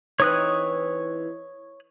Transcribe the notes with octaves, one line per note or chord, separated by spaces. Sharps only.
E3 C4 D#4 C#5 D#6 F#6